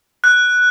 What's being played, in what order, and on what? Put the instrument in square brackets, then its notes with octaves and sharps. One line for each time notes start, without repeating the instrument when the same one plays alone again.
[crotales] F#6